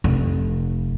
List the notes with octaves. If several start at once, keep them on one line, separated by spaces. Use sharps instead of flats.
F1